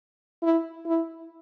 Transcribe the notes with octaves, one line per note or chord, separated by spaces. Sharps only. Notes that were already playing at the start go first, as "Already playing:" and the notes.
E4
E4